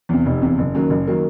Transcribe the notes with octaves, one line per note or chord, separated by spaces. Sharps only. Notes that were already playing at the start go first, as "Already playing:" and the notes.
E2 C3
F1
E2 C3
F#1
F#2 D#3 F#3 A#3
F#1
D#3 F#3 A#3